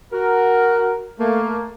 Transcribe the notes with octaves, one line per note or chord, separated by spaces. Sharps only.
F#4 A#4
A3 A#3